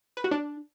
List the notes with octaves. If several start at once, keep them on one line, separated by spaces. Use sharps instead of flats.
B4
F#4
D4